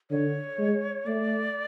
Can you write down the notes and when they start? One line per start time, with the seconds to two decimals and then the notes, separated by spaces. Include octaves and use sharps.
0.11 D3 C#5
0.58 G#3
1.06 A3 D5